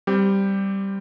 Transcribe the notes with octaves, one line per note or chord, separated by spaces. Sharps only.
G3 C4 G4